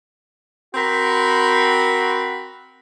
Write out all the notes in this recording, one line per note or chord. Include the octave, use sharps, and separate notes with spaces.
C4 F#4 A#4 B5